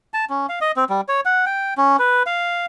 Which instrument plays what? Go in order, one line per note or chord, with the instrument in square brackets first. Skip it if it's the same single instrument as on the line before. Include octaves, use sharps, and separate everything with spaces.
[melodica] A5
C#4
F5
D#5
C4
G3
C#5
F#5
G5
C#4
B4
F5